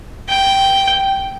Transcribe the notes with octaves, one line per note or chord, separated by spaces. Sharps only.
G5